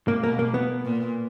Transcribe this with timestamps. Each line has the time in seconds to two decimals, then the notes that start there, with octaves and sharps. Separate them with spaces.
0.08 A#3
0.23 B2 A#3
0.39 A#3
0.54 B3
0.85 A#2